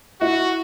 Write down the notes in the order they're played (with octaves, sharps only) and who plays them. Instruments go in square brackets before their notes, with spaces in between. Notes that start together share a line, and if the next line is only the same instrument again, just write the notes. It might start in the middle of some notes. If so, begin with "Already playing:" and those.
[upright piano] E4 [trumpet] F#4